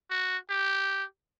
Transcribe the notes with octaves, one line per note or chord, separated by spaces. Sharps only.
F#4
G4